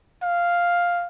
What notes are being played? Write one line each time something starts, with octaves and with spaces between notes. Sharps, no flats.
F5